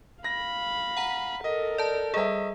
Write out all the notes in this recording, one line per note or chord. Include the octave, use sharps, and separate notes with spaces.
F5 B5 A#6
F#5 A#5 B6
A4 A#4 D#5
D5 A5
G3 G#4 D#5 E5